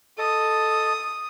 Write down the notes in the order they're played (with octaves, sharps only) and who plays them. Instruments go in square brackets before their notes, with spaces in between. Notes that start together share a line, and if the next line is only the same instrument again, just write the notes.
[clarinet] A4 [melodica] D#5 A5 [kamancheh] D#6